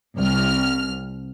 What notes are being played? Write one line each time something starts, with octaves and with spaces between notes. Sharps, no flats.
C2 F6